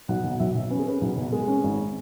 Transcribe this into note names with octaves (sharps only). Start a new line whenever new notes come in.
B1 F#5
B2
B1 E5
B2
C#4 B4
G#4
C#4 B4
B1
B2
G#3
C#4
G#1